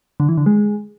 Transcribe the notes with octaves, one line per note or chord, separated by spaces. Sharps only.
D3
E3
D3
G#3